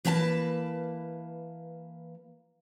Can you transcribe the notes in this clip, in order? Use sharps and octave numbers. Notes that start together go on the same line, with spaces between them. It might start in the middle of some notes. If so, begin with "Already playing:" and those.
E3 A#3 B4 G5 A5